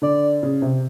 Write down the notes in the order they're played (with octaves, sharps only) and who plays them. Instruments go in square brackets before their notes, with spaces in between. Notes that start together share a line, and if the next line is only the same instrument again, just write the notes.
[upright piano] D3 [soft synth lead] D5
[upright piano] C#3
C3